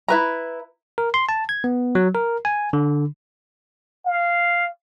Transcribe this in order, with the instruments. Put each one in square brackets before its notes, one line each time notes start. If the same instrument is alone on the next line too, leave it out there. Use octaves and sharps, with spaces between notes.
[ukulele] E4 B4 A#5
[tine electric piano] A#4
C6
A5
G#6
B3
F#3
A#4
G#5
D3
[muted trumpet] F5